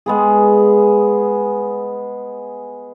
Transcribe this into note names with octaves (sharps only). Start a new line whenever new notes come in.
G#3 B3 G#4